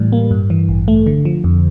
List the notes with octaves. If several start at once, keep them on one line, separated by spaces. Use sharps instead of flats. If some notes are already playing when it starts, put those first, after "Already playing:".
Already playing: A2 E3 G3
A#3
G2
E3
A1
A3
D3
F3
F2